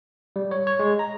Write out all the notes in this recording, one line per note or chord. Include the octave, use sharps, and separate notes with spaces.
G3
C#5
C#5
G#3
A#5